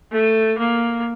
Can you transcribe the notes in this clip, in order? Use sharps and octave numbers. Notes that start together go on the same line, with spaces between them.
A3
A#3